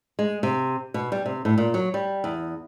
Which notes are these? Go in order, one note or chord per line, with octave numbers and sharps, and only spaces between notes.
G#3
C3
B2
G3
C3
A2
A#2
F#3
G3
E2